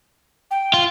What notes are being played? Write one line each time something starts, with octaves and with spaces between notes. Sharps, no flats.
G5
F4